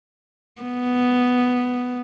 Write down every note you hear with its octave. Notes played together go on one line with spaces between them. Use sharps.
B3